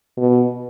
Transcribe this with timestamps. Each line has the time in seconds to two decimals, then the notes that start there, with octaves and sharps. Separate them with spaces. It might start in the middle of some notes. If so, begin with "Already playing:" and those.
0.17 B2